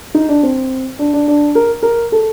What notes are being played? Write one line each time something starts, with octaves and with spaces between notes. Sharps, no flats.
D#4
D4
C4
D4
D4
D4
A#4
A#4
A4